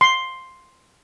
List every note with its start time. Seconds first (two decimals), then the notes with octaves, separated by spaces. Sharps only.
0.01 C6